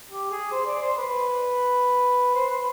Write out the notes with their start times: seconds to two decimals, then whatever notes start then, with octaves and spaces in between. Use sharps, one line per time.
0.11 G4
0.31 G#4
0.52 C5
0.66 D5
0.82 C5
0.97 B4
2.34 C5
2.50 B4